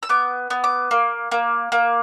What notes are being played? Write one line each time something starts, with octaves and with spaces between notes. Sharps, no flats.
E6
B3 D6
B3
D6
A#3
A#3
A#3